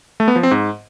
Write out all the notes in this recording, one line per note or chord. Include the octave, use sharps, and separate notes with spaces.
A3
B3
F3
C4
G#2